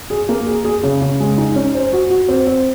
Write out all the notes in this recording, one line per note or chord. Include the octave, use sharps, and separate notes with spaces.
G#4
A#3
G#4
G#4
C#3
C#3
G#3
D#4
C#4
C5
F#4
F#4
C4
C4